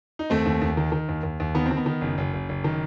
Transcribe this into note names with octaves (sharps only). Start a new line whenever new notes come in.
D#4
D#2 A3 C4
D#2
D#2
D#3
D#3
D#2
D#2
D#2
D#3 B3
C4
D#3
B3
D#3
F#1
F#1
F#1
F#1
D#3